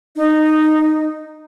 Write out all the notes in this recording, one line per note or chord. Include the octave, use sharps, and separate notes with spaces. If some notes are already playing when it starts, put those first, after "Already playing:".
D#4